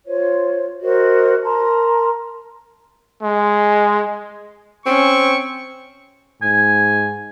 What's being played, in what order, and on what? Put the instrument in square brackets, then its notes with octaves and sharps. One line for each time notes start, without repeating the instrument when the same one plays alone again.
[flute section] F4 C5 C#5
F#4 A#4 C5 D#5
A#4 A5 A#5 C6
[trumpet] G#3
[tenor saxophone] C4 [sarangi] C#4 [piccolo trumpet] C#6
[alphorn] G#2 [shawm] G#5